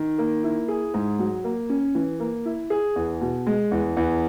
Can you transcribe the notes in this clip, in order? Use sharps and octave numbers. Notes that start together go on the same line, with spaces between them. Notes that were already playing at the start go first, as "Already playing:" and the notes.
Already playing: D#3
A#3
E4
G#4
G#2
F#3
A#3
C#4
E3
A#3
E4
G#4
E2
B2
G#3
E2
E2